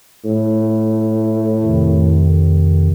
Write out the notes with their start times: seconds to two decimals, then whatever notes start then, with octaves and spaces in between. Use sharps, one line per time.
0.25 A2
1.63 F2 C3 D#3